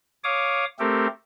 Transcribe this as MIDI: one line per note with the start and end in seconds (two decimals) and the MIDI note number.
0.24 0.65 73
0.24 0.65 77
0.24 0.65 86
0.24 0.65 87
0.79 1.07 57
0.79 1.07 60
0.79 1.07 67
0.79 1.07 69
0.79 1.07 70